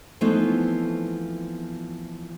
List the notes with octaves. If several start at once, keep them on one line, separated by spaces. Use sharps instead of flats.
E3 F3 A3 B3 C4 D#4